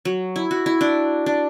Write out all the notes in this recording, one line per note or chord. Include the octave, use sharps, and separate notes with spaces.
F#3
E4
F#4
E4
D4
D4